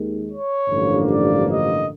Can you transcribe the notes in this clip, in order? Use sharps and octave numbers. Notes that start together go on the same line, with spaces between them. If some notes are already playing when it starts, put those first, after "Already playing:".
Already playing: D#2 D#3 G#3
C#5
A1 G2 D3 F3 A#3
D5
D#5